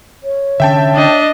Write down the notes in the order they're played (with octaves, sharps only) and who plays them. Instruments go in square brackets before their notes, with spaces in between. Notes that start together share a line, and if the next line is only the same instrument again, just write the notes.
[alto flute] C#5
[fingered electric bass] D3 C#4 [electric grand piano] E5 G5 A5
[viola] D4 D#5